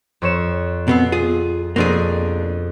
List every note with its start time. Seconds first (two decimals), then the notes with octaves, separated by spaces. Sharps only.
0.22 F2 C#5 E7
0.88 B2 B3 C4
1.12 F4 G#4
1.76 F2 B2 A#3 D4 G#4